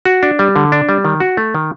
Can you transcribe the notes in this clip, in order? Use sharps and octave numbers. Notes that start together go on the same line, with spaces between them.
F#4
D4
G3
D3
D4
G3
D#3
F#4
A3
D#3